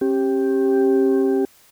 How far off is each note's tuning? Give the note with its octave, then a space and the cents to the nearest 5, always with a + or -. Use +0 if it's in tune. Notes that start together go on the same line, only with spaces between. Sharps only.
C#4 -45 G4 +0